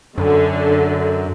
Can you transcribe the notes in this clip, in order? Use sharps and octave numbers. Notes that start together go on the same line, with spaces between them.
F#2 D3